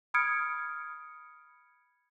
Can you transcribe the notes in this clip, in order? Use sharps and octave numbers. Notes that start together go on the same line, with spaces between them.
B5 D#6 F6 G#6 C#7 D7